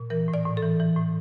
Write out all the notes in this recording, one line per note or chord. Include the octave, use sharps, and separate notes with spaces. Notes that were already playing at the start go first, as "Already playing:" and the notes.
Already playing: A#2
E3 A#4
A2
D5
A2
A4
E3
E3
A2